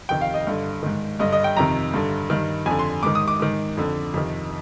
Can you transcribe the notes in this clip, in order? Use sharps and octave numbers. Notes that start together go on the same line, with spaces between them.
F2 C3 D#3 G5
F5
D#5
G2 D3
G#2 D#3
G2 D3 D#5
D#5
G5
F2 C3 D#3 A#5
G2 D3
G2 D#3
F2 D3 G#5
C6
G#2 D#3 D6
D#6
D6
G#2 D#3
F2 D3
F2 C3 D#3